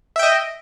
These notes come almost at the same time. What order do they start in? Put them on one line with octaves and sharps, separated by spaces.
E5 G5 D#5